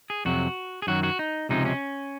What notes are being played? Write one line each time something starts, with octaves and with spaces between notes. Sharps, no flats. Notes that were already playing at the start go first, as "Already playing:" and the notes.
G#4
F2 C3 F#3 F#4
G#4
F#2 D#3 F#3 F#4
F#4
D#4
C#2 C3 F3 G#3 D#4
C#4